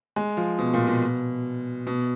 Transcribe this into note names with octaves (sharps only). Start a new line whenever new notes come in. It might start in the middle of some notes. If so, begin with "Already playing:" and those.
G#3
F3
B2
A#2
B2
B2